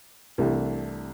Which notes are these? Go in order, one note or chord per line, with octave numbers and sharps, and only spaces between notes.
C2 C3 E3 A3 D4